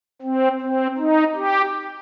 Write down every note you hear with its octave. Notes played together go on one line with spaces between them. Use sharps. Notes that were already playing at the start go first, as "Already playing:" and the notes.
C4
C4
D#4
G4